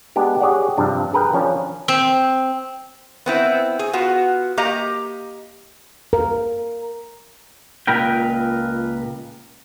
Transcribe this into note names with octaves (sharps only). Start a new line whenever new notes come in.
G#3 B3 D4 G4
G4 G#4 C#5 D5 F#5
G2 C3 F3 D4
G#4 A#4 B4 G5
F3 C#4 D4
C4
B3 C4 E4
G#4
B3 F4 F#4
A#3 G4 D#5 A#5
A#4
C#2 A#2 A#4 B4 G5